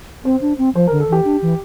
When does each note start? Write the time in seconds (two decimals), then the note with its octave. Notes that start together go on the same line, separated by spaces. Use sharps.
0.24 C4 C5
0.41 D4
0.58 C4
0.75 F3 C5
0.87 A#4
0.91 D3
1.00 A4
1.08 E3 G4
1.25 D4
1.42 E3